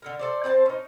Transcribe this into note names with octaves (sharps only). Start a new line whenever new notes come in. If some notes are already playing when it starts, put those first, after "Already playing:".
D3 A4 A#4
A4 C5 D5
C4 C5 G5 A5
C#4 D#4